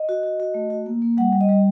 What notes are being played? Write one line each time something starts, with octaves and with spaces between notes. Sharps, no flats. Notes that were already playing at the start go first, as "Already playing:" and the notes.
Already playing: D#5
F#4
F#4
F#4
A3
F#4
A#3
A#3
G3 F#5
G3
D#5
G3